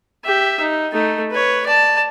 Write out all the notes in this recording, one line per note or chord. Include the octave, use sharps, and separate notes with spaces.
G4 E5
D#4
A3 D#4
B4 C#5
D5 A5